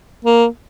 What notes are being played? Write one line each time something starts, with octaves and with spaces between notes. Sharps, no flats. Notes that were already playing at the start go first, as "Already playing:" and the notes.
A#3